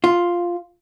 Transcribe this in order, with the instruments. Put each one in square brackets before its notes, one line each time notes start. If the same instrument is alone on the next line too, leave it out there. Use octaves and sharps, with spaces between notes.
[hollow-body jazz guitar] F4